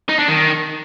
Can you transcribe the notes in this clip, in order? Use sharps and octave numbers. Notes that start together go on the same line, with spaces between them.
D#4
D4
D#3